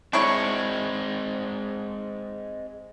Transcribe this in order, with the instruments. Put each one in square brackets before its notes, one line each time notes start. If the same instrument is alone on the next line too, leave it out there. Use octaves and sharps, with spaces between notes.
[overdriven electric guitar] G#3 C4 [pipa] D4 E4 C#5